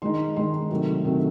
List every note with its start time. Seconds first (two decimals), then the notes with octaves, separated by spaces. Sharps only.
0.02 D#3 G#3 D#4 C6
0.36 D#3 G#3 D#4 C6
0.71 C3 D#3 F#3 A3
1.04 C3 D#3 F#3 A3